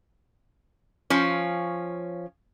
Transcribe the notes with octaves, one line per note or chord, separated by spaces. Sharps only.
F3 C#4